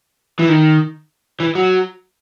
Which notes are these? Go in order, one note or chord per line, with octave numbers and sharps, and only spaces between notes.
E3
D#3
E3
F#3